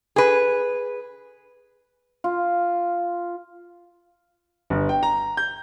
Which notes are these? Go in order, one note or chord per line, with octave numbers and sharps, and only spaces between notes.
G#4 B4
F4
G1
G5
A#5
G6